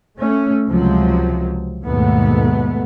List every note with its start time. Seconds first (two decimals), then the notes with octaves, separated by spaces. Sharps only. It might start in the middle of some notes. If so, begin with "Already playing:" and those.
0.17 A3 C#4
0.69 C#2 C3 F3 F#3
1.84 D#2 G#2 B2 A3 B3